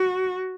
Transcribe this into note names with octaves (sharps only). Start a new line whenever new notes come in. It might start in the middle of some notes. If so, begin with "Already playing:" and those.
Already playing: F#4